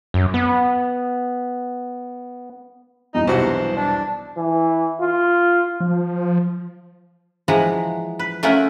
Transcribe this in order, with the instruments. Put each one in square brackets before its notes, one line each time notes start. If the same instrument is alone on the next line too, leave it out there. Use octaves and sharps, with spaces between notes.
[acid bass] F#2
B3
[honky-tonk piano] E2 G2 B2 [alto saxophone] D#4
[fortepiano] B1 C3 F#4 [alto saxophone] C5
[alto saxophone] D4
[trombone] E3
F4
[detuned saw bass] F3
[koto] E3 F3 G#3 F#5 A#5
B4
A3 C#4 F4 A#4 E5 F#5